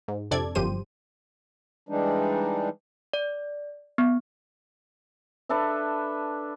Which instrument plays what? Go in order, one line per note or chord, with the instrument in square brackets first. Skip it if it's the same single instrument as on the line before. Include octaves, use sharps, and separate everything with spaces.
[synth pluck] G#2
F2 C3 D4 A4 D5 G#6
G1 F#2 F3 G4 C5 D#7
[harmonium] E3 G3 G#3 D4 D#4
[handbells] D5
B3
[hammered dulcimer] D4 A4 B4 E5